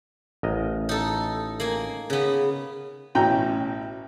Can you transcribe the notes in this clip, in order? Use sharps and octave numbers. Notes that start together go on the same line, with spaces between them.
A1 A#4 D#5
D#4 A4
A#3 G#5
C#3 B3
A1 B2 C#4 G5 A#5